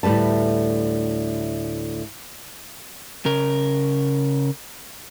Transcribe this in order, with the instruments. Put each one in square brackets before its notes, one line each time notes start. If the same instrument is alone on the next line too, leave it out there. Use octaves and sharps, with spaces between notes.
[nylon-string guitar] D2 A2 G3 B4 A5
[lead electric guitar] C#3 A#4